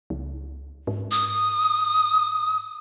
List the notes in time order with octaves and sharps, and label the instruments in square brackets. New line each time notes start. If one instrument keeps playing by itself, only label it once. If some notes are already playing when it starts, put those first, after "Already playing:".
[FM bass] C#2
G#2
[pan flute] D#6